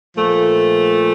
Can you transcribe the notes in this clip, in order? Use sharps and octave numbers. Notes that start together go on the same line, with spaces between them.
A#2 F3 A3